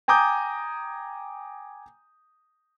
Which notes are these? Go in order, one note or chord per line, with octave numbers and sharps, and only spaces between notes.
G5 G#5 A#5 D6 D#6 G6